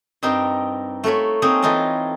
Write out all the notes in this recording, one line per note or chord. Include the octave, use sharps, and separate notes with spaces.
G2 C4 D#4 A#4 G5 C6
A3 F4 A#4 C#5 B5
A#3 C4 D#4 G#4 A#4 C#5
E3 D#4 F4 A4 D#5